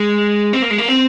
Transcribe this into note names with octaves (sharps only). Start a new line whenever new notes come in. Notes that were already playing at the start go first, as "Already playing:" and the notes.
Already playing: G#3
C4
A#3
G#3
A#3
C4